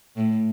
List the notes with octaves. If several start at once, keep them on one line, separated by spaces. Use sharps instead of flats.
A2